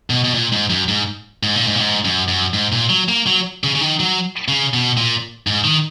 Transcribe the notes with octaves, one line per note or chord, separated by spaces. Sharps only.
B2
B2
A#2
G#2
F#2
G#2
G#2
A#2
G#2
A#2
G#2
F#2
F#2
G#2
A#2
F#3
A#3
F#3
C#3
C#3
D#3
F#3
C#3
B2
A#2
G#2
D#3